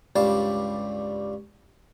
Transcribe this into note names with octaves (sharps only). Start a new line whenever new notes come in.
C#2 G2 G3 D5 F5 A5